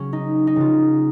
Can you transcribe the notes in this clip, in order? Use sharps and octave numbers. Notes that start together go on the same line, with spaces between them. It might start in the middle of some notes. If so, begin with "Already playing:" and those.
Already playing: C#3 F#3 C#4
D#4
D#4
C#3 F#3 F4